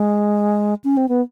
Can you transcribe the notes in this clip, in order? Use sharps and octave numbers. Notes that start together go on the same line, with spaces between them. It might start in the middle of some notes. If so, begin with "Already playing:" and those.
Already playing: G#3
C#4
C4
B3